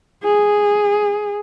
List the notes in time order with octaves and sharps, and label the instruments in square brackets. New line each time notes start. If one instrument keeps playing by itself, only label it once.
[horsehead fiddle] G#4